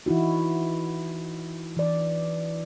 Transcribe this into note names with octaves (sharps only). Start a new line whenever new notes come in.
E3 D#4 E4 F#4
E3 D5